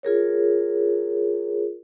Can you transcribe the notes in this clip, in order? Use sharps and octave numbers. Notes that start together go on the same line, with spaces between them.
F4 G#4 A#4 C#5